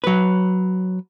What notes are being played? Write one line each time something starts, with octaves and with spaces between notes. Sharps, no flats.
F#3 B4